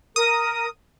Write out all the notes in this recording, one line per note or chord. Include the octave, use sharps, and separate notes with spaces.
A#4 D#6